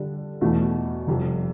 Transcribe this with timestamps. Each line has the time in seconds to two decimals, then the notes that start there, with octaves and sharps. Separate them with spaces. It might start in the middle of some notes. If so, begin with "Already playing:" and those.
Already playing: D3 G3 D4
0.41 E2 B2 A3
1.07 F1 F2 C3 G3